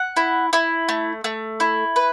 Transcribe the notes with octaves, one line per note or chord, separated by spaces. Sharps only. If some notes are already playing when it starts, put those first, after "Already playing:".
Already playing: F#5
E4
E4
A3
A3
E4
B4